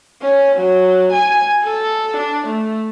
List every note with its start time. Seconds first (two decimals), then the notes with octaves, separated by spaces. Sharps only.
0.22 C#4
0.56 F#3
1.13 G#5
1.64 A4
2.17 D4
2.47 A3